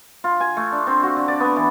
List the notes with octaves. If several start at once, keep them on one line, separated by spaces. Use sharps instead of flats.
F4
G#5
A3
D4
C4
F#4
D3
D5
B3
E3